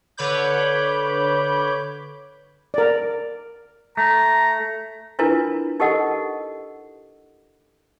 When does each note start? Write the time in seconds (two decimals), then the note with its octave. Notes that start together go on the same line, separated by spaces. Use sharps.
0.17 D3 B4 C#5 B5 D6 G6
2.74 A#4 D5
3.97 A3 A#5
5.19 D4 E4 F4 A#4 B4
5.80 D#4 G4 A4 A#4 D#5 F#5